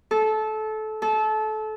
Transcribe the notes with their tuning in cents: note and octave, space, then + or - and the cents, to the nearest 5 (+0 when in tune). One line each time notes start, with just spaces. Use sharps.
A4 -20
A4 -25